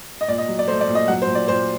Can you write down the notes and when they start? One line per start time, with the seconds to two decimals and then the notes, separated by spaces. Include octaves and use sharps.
0.21 D#5
0.28 A#2 D5
0.38 D#5
0.48 F#3
0.59 D5
0.68 A3 C5
0.81 D5
0.88 A#2
0.95 D#5
1.08 F#3 F#5
1.22 C5
1.27 A#2
1.35 D5
1.48 A#2 C5